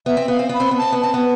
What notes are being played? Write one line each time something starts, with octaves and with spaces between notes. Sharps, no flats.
B3 E5
C4
B3 F5
C4
B3 B5
C4
B3
C4 A5
B3
C4 A5
B3